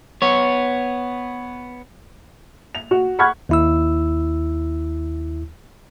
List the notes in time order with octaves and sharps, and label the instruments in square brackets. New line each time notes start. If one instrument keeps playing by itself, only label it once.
[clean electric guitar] B3 C#5
[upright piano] F7
F#4
F#5 B5 C#6 F6 F#6 G#6
[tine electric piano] D#2 E4 E6